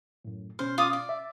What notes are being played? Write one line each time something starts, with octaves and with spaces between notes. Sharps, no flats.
F#2 A2
B2 C#4 C5 F6
F4 D6 D#6
D5
E5